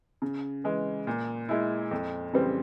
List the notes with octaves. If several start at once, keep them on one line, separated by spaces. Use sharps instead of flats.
C#3
E3 G#3
A#2
G#3 E4
F2
C#3 E3 G3 C4